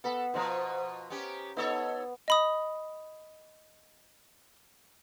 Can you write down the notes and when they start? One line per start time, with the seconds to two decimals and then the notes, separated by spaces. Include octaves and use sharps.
0.04 B3 A4 F#5 B5
0.34 B2 F3 C5 D#5 A#5
1.10 B3 C#4 G4
1.57 B3 D#4 A4 C#5
2.28 D#5 B5 D#6